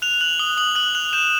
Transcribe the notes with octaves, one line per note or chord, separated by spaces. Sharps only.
F#6 F7
F#6 F#7
D#6 G7
D#6 F#7
F#6 F#7
F#6 F7
G6 E7